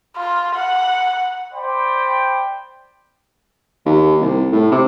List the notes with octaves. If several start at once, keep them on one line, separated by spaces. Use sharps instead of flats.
F4
F#5
C5 D5 G5 B5
D#2
C2
A2
C3